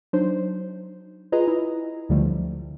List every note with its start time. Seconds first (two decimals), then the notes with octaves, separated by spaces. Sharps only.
0.13 F#3 D4 D#4 C5
1.32 F4 G#4 B4 D#5 A#5
1.48 E4
2.09 D2 D3 F3 G3 A3